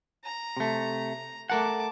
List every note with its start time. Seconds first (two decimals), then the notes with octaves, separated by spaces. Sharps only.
0.24 A#5
0.57 C3 A3
1.50 A3 A#4 F#5 A5 D6